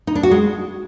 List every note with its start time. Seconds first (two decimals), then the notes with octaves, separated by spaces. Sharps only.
0.07 D#4
0.15 D4
0.23 F#4
0.31 G#3